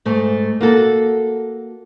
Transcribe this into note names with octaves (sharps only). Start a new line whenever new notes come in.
G#2 A3
A#3 F#4 A4